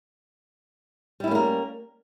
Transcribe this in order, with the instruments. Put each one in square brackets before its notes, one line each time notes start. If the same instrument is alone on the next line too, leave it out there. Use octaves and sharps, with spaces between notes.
[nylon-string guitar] G3
E4
C#4
A#3
A#4